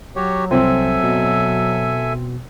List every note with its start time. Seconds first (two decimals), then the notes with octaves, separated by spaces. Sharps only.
0.16 F#3 F#4 G4 C#5
0.51 C2 C4 A4 E5 G#5
1.03 B2